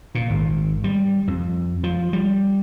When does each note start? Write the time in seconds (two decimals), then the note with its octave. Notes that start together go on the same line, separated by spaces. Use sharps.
0.15 A#2
0.30 G#1
0.84 G3
1.28 F2
1.84 F3
2.13 G3